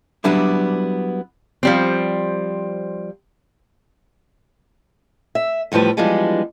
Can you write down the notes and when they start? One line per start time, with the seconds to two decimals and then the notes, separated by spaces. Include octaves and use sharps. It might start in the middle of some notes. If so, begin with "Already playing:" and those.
0.24 F#3 G3 B3 D4 E4
1.63 F3 G3 C4
5.35 E5
5.72 E2 A2 F3 G3 B4
5.97 E3 F3 G3 G#3 B3 D4